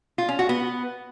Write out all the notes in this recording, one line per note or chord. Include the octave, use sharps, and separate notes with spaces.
F4
C#4
F#4
B3